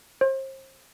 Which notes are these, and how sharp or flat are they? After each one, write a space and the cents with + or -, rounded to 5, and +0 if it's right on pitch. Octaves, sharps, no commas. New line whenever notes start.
C5 +35